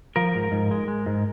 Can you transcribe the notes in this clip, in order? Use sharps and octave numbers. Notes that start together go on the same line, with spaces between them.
F3 A#4
G#2
G#2
G#3
G#3
G#2